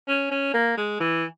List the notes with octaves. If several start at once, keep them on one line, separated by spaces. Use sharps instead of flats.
C#4
C#4
A#3
G#3
E3